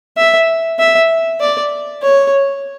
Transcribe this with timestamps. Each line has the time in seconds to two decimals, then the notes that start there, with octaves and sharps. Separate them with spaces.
0.17 E5
0.79 E5
1.41 D5
2.02 C#5